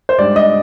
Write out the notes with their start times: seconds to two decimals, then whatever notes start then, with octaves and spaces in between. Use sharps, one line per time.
0.09 C5
0.18 G#2 G3 D4 D5
0.36 D#5